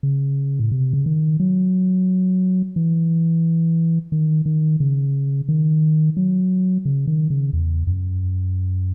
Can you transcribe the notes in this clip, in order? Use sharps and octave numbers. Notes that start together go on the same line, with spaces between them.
C#3
A2
C3
C#3
D#3
F#3
E3
D#3
D#3
C#3
D#3
F#3
C#3
D#3
C#3
E2
F#2